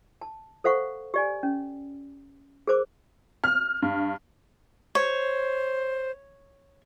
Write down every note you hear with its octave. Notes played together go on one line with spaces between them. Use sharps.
A5
A4 C5 F5 F#5 C#6
G4 D5 G#5
C#4
G#4 A#4 C5 D6
F6
G2
C5 C#5